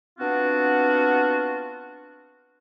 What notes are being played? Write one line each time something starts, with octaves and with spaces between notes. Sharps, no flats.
B3 C4 D4 F4 F#4